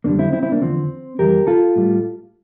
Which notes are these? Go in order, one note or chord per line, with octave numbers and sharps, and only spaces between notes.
F2 D3 G3 A#3 D4
C4 E4
C4 E4
C4 E4
A#3 D4
E2 D3 F3 C4
F2 E3 G3 G4 A#4
F4 A4
A2 G3